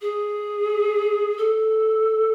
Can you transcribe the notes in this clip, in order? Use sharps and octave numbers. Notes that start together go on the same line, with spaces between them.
G#4
A4